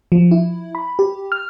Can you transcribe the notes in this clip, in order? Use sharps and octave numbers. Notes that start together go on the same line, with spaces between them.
F3
E4
B5
G4
F6